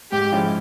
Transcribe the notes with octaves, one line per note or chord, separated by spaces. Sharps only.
G#2 G4
F3 G#3 C#4 E4